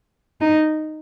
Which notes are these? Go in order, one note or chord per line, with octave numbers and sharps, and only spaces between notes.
D#4